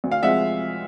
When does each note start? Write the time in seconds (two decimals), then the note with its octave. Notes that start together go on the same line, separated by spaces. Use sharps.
0.04 D2
0.11 F5
0.23 C3 F3 G#3 E5 F#5